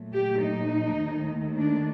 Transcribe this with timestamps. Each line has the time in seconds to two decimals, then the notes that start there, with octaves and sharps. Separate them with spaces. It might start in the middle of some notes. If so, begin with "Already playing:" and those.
Already playing: A#2 F#3 A3
0.14 G4
0.43 D#4
1.00 D#2 D#3 A3
1.58 D4